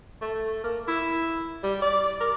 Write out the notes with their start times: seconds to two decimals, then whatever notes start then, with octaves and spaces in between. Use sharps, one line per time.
0.21 A3
0.64 A#3
0.88 E4
1.63 G3
1.82 D5
2.20 A#4